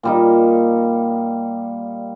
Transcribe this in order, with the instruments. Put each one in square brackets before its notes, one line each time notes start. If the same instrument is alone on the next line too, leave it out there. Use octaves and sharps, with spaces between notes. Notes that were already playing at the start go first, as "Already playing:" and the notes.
[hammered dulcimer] A#2 G3 D#4